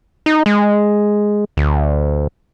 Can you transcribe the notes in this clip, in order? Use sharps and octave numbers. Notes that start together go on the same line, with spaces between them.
D#4
G#3
D2